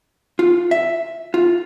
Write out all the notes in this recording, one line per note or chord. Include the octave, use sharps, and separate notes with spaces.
F4
E5
F4